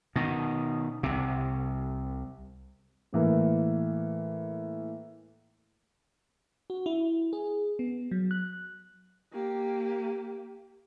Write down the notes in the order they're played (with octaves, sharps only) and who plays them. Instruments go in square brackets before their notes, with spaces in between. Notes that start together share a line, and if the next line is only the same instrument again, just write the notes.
[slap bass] B2 D#3
C2 C3
[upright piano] A2 E3 A#3
[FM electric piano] F#4
E4
G#4
B3
F#3
F#6
[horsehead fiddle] A#3 G4